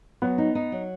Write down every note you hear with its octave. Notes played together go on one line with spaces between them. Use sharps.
F#3 B3
D#4
D#4
F#3